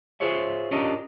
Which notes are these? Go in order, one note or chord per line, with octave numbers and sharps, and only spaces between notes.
F4 G#4 C5 C#5 E5
C#4 D4 F4 G4 A#4 D#5